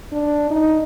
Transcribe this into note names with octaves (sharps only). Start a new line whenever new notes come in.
D4
D#4